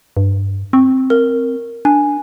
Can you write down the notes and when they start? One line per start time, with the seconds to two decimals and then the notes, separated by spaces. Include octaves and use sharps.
0.17 G2
0.73 C4 C#6
1.10 A#4
1.85 D4 G#5